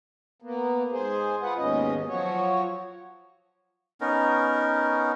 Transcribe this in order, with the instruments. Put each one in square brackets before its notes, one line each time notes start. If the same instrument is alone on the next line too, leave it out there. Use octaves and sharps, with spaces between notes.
[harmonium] A#3 B3
G#2 G#4 C5
F4 G#4 B4 F#5
D#2 G#2 B2 C#4 D#5
F3 F#3 F#4 C#5
[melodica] B3 C#4 D#4 A#4